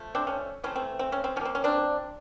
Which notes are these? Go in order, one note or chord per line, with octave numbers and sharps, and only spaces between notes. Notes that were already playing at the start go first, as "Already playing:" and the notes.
Already playing: F3 A3
C4 D4
C#4
E3 A3 C4 C#4
C4
C4
C#4
C4
F3 A#3 C4 C#4
C#4
C4 D4